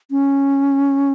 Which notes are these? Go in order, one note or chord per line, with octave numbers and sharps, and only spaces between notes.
C#4